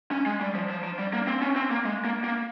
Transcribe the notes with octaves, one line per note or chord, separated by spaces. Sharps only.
C#4
G#3
G3
F3
F3
F3
G3
A#3
C4
C#4
C4
A#3
G#3
A#3
A#3